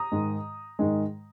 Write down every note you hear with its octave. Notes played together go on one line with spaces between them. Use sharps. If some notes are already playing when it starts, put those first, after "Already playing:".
Already playing: A#5 D#6
G#2 D#3 G#3
G#2 D#3 G#3